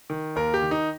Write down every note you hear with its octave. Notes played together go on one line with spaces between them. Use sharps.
D#3
D#2 A#4
G4
D#3
D#4